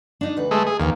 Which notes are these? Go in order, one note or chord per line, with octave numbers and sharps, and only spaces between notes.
D4 D#4 D#5
D2 B4
G#3 A3
G#4
D#2 E3 F5